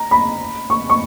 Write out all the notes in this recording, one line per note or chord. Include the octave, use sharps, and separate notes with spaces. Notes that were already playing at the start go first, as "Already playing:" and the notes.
Already playing: A#5
B5
C#6
C#6